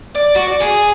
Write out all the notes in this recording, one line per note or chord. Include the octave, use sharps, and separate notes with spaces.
D5
F#4
D5
G#4